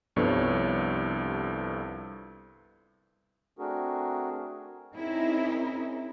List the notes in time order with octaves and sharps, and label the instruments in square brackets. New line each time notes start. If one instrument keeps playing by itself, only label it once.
[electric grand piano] C2 G2 F3 B3 A4 C#5
[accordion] A3 C4 D4 F#4 G#4 A#4
[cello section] C4 C#4 D#4 E4 G#4 A#4